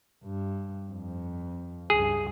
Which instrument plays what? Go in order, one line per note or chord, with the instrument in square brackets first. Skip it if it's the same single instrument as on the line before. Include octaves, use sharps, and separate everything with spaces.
[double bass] G2
F2
[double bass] C#2 G2 [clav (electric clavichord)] G#4